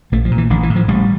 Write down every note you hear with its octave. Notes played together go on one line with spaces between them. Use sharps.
A#1 A3
F3
A#2
E3
A1 D3
E3
A2
F3
A1 G3